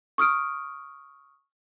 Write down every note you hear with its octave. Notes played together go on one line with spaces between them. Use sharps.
C#6 D#6 F6 D7